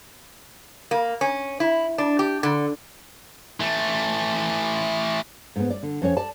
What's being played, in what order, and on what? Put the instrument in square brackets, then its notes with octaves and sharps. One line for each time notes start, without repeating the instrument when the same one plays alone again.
[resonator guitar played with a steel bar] A#3
C#4
E4
D4
G4
D3
[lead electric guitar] E3 A3
[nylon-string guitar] G#2 B3
D5
D3
F2 C#4 C#5
D5 A5